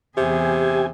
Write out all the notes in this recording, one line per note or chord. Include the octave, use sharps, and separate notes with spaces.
E2 C3 G4 G#4 G#5